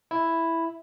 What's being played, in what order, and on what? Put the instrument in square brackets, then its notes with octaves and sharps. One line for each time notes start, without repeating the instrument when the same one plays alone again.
[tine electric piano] E4